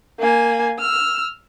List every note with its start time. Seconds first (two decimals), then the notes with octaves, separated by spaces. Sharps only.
0.19 A#3 G#5
0.79 E6 F6